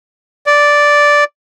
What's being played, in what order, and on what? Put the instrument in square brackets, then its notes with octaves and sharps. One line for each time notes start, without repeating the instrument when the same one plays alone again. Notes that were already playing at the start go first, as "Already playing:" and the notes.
[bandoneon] D5